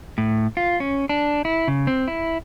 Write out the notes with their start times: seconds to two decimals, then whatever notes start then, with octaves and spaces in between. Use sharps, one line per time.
0.18 A2
0.57 F4
0.80 C#4
1.09 D4
1.45 E4
1.68 C#3
1.87 C4
2.08 E4